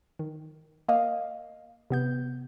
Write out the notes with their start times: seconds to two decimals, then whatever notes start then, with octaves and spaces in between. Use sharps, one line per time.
0.19 D#3
0.88 A#3 D#5 F5
1.90 C3 B3 G6